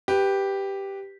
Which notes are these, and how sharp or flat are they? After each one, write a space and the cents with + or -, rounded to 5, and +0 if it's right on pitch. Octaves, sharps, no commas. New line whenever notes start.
G4 +0 B4 +0